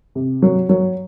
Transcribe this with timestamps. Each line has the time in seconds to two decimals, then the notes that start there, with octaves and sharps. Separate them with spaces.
0.15 C3
0.42 F#3
0.69 F#3